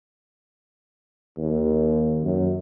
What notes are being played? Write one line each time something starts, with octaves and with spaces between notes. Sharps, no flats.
D#2
F#2